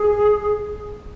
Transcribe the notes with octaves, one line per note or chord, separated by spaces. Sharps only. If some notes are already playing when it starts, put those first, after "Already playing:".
Already playing: G#4